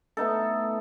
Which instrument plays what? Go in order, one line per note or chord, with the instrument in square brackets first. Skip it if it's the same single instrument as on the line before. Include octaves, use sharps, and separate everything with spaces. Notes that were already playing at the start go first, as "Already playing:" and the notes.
[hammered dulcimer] A3 B3 D#4 A4